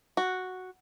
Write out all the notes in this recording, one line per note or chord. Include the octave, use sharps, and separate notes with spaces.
F#4